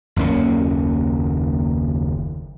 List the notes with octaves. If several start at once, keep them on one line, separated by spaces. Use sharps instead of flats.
F#1 D#2 A#3 C#4